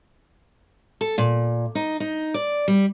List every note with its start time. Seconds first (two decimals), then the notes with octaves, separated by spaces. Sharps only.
1.01 A4
1.18 A#2
1.75 D#4
2.00 D#4
2.34 D5
2.68 G3